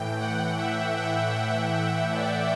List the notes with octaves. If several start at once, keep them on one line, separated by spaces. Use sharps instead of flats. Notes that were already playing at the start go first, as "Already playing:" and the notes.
Already playing: A2 E3 G5
F#5
E5
G5
F#5
E5
D5